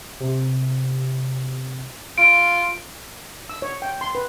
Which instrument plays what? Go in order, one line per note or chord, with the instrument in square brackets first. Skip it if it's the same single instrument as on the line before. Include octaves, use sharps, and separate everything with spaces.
[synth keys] C3
[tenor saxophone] F4 [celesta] D7
[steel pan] E6
C#5
G5
C6
B4